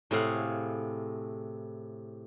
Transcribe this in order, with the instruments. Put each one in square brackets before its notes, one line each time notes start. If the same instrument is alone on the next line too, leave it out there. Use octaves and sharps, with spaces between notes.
[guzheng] A2 C3 G#4 F5 F#5